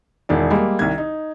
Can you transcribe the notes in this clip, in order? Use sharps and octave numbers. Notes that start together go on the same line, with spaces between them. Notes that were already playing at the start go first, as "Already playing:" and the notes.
E1 D#3 E4 D5
G3 G#3 A#3
C2 D#3 G#6
D#4